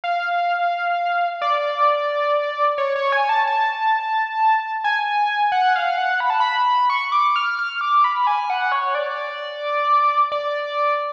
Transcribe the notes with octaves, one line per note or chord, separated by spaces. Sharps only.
F5
D5
C#5
C#5
G#5
A5
A5
G#5
F#5
F5
F#5
B5
A5
B5
C#6
D6
F6
F6
D6
B5
G#5
F#5
C#5
D5
D5